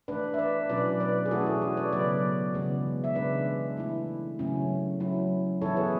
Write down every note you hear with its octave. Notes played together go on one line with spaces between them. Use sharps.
E3 A3 D4 B4 D5
E5
B4 D5
B2 F#3 C#4 E4 B4 D5
B4 D5
G#4
E3 A3 C#4 E4 F#4 A4
G#4
F#4
B4 D5
C#3 F#3 B3 B4 D5
C#3 E3 G#3 B3
E5
C#3 E3 G#3 D4 B4 D5
E3 A3 E4
C#3 F#3 A3 C#4 E4
F#3 C#4 E4
E3 B3 E4 A4 C#5
G#4 B4